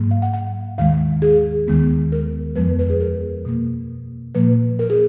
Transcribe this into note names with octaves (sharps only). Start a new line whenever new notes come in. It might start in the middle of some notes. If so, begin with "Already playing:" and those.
Already playing: G#2 F#3 A#3
F5
F#5
F#5
D#2 D#3 G#3 F5
G#4
D#2 D#3 G#3 B3
A#4
F2 F3 G#3 B3 B4
B4
G#4
A#4
B2 A#3
A#2 F3 A#3 B4
A#4
G#4